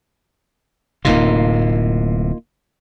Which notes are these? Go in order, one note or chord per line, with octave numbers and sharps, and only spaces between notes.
D1 A2 C3 A#3 D#4 F4